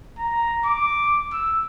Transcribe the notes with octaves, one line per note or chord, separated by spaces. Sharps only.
A#5
D6
E6